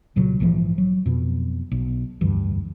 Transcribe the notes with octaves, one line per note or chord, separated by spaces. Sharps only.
C2 A#2 C#3 F#3
A#1 G#2 E3 F3
F#3
F2 B2
B1
F1 D2 G2 E3